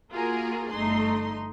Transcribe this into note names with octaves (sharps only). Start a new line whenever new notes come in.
A#3 F4 F#4 G#4 A#4
G1 A3 D#4 C6